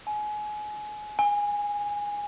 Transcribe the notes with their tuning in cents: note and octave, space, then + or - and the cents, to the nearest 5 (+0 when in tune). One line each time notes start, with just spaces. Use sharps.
G#5 +25
G#5 -15